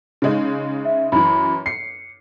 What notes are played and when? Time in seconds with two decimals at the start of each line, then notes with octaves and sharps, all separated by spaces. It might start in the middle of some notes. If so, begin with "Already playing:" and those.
0.22 C#3 G#3 D#4
0.85 E5
1.12 F#2 E3 B5
1.66 C7 C#7